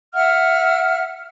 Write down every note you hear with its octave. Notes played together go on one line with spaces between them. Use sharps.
E5 F#5 F6